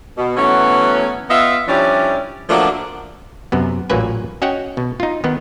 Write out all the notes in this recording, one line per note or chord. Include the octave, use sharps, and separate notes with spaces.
B2
E3 F#3 A3 B3 C#4
B3 F4 D#5 E5
F3 G3 C#4 D4 E4 D5
F3 F#3 A3 A#3 D4
F#2 C3 B3
A1 A#2 F#3 A#3 B4 G#5
C#4 F#4 C#5 D#5 F#5 G5
B2
D#4 F4
D#3 B3